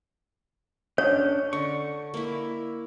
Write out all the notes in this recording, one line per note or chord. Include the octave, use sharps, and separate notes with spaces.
C#4 D4 C#5
D3 C#6
A#3 E4